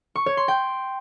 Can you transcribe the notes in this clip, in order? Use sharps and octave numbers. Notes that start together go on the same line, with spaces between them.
C#6
C#5
C6
G5